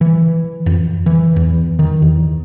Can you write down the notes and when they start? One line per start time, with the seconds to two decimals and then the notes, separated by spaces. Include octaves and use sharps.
0.01 E3
0.66 F2
1.06 E3
1.36 E2
1.79 D#3
2.02 E2